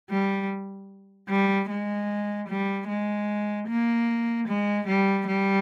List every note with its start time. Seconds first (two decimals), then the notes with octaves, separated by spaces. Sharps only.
0.10 G3
1.29 G3
1.70 G#3
2.49 G3
2.88 G#3
3.69 A#3
4.48 G#3
4.87 G3
5.27 G3